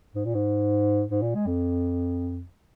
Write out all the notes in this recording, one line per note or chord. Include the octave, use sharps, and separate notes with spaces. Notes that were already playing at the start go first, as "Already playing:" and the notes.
G#2
A#2
G#2
G#2
A#2
G#3
F2